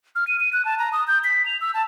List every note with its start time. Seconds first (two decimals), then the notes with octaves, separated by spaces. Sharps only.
0.16 F6
0.27 D#7
0.40 D#7
0.53 F#6
0.65 A5
0.79 A#5
0.92 D#6
1.08 G6
1.24 B6
1.46 F7
1.61 E6
1.74 A5